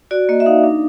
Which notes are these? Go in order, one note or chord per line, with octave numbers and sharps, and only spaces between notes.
F#4 D5
A#3 D#5
E5
D#4 F5
D4